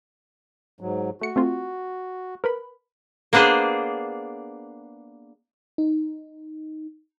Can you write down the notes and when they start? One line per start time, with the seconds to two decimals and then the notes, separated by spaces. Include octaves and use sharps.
0.81 G#2 F#3
1.21 A3 F#4 C#7
1.36 A3 C4 F4
2.44 A#4 B4 B5
3.33 A#3 B3 D4 G#4 C5
5.78 D#4